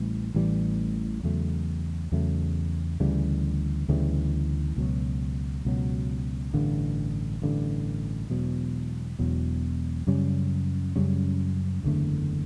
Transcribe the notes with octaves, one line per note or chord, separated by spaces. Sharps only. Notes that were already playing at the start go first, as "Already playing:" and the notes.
Already playing: A1 A2 E3 G3
A1 A2 E3 G3
E2 C#3 F#3 A3
E2 C#3 F#3 A3
D2 C#3 E3 G3
D2 C#3 E3 G3
C#2 B2 F#3
C#2 B2 F#3
A1 G2 D3
A1 G2 D3
E1 E2 B2 F#3
E1 E2 B2 F#3
F#2 C#3 G3 C#4
F#2 C#3 G3 C#4
F#1 E2 D3 A3